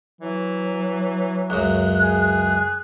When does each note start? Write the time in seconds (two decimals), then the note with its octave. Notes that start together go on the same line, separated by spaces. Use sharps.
0.21 E3 F#3
1.50 C#2 F#2 F#6
2.00 G#4